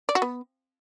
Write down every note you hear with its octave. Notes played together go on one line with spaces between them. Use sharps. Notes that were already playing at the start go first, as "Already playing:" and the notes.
D5
F#4
B3